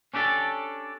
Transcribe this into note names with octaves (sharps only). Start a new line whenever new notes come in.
C#4 D4 G4 A4